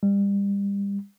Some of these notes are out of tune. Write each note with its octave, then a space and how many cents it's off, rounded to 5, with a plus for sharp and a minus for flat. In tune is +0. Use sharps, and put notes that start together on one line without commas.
G3 +30